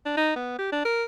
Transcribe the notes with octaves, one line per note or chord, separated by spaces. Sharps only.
D4
D#4
B3
G4
D4
A#4